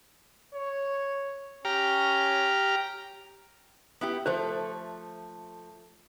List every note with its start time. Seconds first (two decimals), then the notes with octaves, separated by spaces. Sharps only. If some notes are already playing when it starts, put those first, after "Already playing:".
0.54 C#5
1.65 C#4 G4 A#5 F6
4.01 B3 E4 G4
4.26 F3 A3 A4 C5